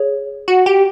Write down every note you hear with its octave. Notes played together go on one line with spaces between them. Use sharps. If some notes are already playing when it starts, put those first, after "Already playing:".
Already playing: G#4 C#5
F#4
G4